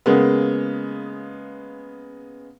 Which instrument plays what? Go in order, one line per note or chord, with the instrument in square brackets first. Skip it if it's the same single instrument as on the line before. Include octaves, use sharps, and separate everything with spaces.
[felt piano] C#3 G#3 A#3 B3